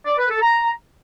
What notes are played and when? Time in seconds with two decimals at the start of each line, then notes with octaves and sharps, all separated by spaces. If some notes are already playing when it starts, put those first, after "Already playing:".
0.06 D5
0.18 B4
0.30 A4
0.42 A#5